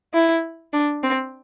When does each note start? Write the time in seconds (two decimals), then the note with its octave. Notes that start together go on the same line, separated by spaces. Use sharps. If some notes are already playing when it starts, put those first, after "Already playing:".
0.14 E4
0.73 D4
1.03 C4